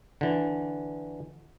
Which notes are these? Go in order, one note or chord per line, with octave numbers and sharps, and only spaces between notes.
D3 E3